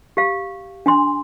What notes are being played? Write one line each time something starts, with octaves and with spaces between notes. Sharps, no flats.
G4 F5
D4 G#5 C6